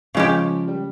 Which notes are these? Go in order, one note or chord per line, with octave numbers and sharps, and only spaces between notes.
C#3 F3 G#3 C#4 G4
G3